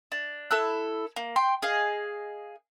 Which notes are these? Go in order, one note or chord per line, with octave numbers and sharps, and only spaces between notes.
D4
E4 A4 E6 F#6
A#3
G5 C6
G#4 D#5 F5